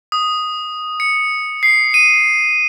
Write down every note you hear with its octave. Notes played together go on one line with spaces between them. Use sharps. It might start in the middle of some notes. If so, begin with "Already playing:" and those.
D#6
C#7
C7
D#7